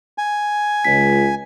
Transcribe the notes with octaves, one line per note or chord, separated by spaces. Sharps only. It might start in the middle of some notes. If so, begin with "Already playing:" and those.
G#5
C#2 B6